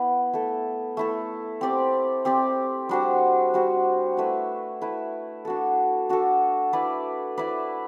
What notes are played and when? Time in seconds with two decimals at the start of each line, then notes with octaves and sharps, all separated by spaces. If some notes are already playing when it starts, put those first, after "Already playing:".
Already playing: B3 E4 B4 D5
0.33 A3 E4 A4
0.97 A3 E4 A4
1.61 C4 G4 D5
2.25 C4 G4 D5
2.89 G3 D4 F#4 C5
3.54 G3 D4 F#4 C5
4.17 A3 E4 B4 E5
4.81 A3 E4 B4 E5
5.45 D4 F#4 A4
6.09 D4 F#4 A4
6.73 E4 B4 D5
7.37 E4 B4 D5